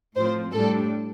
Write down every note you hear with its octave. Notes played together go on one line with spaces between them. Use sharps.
A2 F3 C4 C5
A2 G3 D4 A4